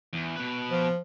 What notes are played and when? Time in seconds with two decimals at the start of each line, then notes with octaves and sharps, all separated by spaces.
0.13 E2
0.36 B2 B4
0.70 F3